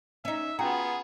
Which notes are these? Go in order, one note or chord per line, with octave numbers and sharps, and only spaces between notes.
C#4 D#4 E5
B3 C#4 F4 F#4 G#4 G5 A#5